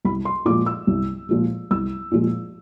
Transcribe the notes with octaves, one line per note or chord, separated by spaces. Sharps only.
C2 B5
C6
A#2 F3 G#3 D6
E6
C2
A#2 F3 G#3
C2 E6
A#2 F3 G#3